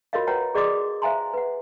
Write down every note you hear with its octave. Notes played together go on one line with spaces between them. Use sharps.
F4 F#4 A#4 C#5 D#5 F5
B4 C#5 F#5 G5 A#5
G#4 D5 D#5 C6 D6 D#6
C5 E5 F5 G#5 A#5 C6
B4 F#5